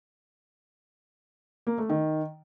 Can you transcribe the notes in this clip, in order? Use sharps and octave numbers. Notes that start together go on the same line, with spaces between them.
A#3
A3
D#3